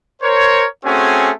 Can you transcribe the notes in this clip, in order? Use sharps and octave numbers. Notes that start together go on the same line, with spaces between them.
A#4 C5 C#5
A3 C4 C#4 F#4 G#4 G#5